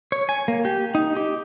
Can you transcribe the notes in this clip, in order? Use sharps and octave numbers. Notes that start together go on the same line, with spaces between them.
C#5
G#5
A#3
G4
D#4
G4